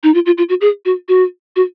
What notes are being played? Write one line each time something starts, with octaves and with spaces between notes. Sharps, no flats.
D#4
F4
F4
F4
F#4
G#4
F#4
F#4
F#4